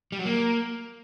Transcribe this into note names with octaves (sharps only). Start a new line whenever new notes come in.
G3
F#3
A#3